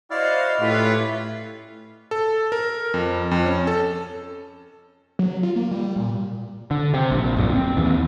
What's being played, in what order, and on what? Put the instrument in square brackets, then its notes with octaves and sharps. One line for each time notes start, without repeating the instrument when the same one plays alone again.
[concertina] E4 D5 [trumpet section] F#4 C5 F5 [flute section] D#5
[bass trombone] A2 [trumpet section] C#4 F4 B4 [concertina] G4 [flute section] E5
[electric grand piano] A4
A#4
F2
F2
C#4
A4
[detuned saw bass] F#3
F4
A#3
G3
A#2
[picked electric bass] D3
C3
A#1
D1 F#2 A#2
C4
D#2 E3